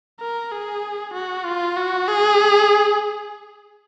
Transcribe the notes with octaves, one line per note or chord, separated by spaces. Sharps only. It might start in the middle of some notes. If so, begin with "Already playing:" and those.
A#4
G#4
F#4
F4
F#4
G#4